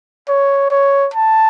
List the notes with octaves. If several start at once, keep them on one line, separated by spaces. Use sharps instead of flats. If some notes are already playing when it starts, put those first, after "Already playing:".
C#5
C#5
A5